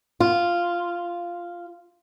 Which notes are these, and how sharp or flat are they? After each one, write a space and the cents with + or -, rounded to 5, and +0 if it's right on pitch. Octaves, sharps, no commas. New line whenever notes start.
F4 -5